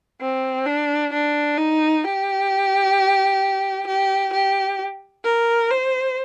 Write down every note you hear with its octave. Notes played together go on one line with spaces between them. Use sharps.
C4
D4
D4
D#4
G4
G4
G4
A#4
C5